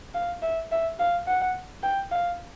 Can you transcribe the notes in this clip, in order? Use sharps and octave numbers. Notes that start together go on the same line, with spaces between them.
F5
E5
E5
F5
F#5
G5
F5